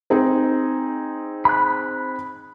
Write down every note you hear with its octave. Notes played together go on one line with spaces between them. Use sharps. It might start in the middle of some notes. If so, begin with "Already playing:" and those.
C4 D#4 G#4
B5 F#6